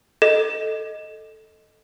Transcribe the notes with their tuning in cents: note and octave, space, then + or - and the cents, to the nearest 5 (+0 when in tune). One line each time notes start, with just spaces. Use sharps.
A4 +0 D#5 +0